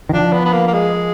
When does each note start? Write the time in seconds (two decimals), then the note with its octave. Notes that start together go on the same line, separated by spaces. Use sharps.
0.09 D#3
0.13 F3 D4
0.33 B3
0.46 B3
0.53 A#3
0.68 A#3
0.74 G#3